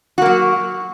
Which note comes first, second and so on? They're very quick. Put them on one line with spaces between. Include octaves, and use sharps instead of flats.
F#4 A#3 F#3